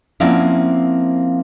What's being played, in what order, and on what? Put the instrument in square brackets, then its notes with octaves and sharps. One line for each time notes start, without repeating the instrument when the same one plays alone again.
[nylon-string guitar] F3 A#3 C4 C#4 E4 F#5